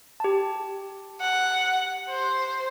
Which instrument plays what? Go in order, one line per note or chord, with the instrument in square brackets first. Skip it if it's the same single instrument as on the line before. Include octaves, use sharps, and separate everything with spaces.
[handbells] G4 A5
[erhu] F#5
C5